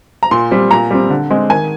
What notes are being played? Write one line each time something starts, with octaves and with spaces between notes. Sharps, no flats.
A#5
A#2 C6
G3 C4
A#2 A#5
G3 C4
D3
G#3 C4
D#3 G#5